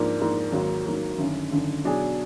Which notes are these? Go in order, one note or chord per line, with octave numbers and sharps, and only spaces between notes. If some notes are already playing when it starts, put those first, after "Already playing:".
Already playing: G#2 F3 A#3 D4
G#2 F3 A#3 D4
G#1 G#2 F#3 A#3
G#1 G#2 F#3 A#3
G#1 F#2 D3
G#1 F#2 D3
B2 F#3 D4 G#4